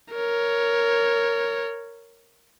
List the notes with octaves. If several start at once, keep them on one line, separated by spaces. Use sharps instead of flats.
A#4 C#5